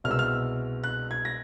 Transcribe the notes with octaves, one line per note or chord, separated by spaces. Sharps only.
C2 B2 G#3 F6
E6
F6
F#6
G#6
A#6